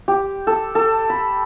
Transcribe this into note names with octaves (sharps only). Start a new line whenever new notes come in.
G4
A4
A4
B5